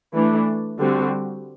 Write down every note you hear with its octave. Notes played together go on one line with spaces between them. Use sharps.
E3 A3 D4
D3 G3 C4 F#4